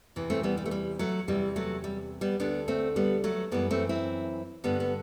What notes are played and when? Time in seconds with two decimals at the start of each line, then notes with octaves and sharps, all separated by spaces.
0.16 E2 C3 E3
0.30 A3 C4
0.43 G3 B3
0.57 G3
0.66 A3
0.71 G3
0.99 F#3 A3
1.28 E2 C3 E3 G3
1.56 F#3 A3
1.84 G3
2.21 G3 B3
2.40 D2 D3 B3 D4
2.68 A3 C4
2.96 G3 B3
3.24 F#3 A3
3.51 F#2 E3 G3 B3
3.71 A3 C4
3.89 C4 E4
4.64 G2 D3 G3 B3
4.80 B3